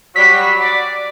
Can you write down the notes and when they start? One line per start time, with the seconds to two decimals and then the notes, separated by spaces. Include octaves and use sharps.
0.16 F#3 G3 F#4 B6
0.60 D5